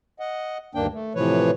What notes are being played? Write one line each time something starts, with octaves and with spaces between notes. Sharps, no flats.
D#5 F#5
D2 G2 D#3 A#3 D4 G5
A3
A2 C3 E3 F3 B4 C#5